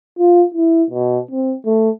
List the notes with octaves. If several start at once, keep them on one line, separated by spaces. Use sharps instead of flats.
F4
E4
B2
C4
A3